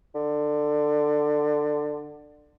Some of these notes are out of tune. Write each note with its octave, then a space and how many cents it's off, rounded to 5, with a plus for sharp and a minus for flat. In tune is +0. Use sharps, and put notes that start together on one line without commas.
D3 +20